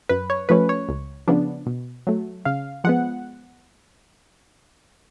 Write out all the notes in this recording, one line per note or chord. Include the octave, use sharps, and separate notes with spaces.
F#2 B4
C#5
F3 A3 C#4 B4
C#5
C#2
C#3 F3 B3 D4
B2
F#3 A3
C#3 F5
F3 G#3 B3 F#5